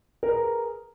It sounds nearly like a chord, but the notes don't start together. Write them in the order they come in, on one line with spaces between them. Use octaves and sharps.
A#4 B4 G#4